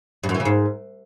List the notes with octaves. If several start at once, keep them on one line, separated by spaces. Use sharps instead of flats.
G2
F#2
E3
C#3
G#2